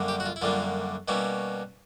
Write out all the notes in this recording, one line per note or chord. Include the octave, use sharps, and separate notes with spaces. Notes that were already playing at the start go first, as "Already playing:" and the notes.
Already playing: F#2 D3 G3 A#3
G4
F#4
F4
E4
F#2 D3 G3 A#3 F4
B2 G3 A#3 C#4 E4